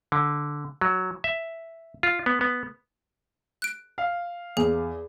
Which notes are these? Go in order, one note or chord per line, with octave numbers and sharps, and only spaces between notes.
D3
F#3
E5
F4
B3
B3
F#6 D7
F5
E2 G#4